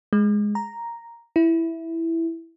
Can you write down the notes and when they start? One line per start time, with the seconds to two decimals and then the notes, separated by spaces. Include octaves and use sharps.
0.13 G#3
0.55 A#5
1.36 E4